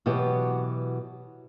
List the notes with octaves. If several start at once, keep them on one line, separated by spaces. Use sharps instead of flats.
B2 E3 F#3 B3 G4